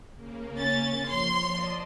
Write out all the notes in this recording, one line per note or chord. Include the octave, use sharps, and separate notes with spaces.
C#3 A#3
C#4 A6
F3 C#5 C6
D5 D#5 A5